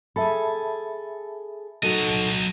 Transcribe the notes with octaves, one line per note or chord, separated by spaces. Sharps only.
G#4 A4 E5 A5 B5
F#3 D#4 F#4 A4 D#5